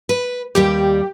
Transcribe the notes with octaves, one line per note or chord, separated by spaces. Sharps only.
B4
D#2 G3 G4 D5